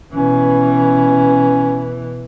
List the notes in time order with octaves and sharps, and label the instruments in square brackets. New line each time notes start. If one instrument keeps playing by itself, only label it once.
[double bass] B2 E3 [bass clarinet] C#4